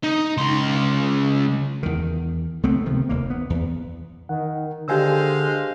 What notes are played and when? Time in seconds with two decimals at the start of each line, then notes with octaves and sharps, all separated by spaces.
0.03 D#4
0.37 C#2 C6
1.83 E2 D#3
2.63 C#2 A3 B3 C4
2.86 C3 D#3 F3
3.09 F1 D#2 A#3
3.30 B3
3.50 E2
4.29 D#3 F#5
4.88 D3 G#3 G4 C5 F5 G#5 E6